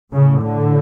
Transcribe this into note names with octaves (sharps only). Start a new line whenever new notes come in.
A2 C#3
D3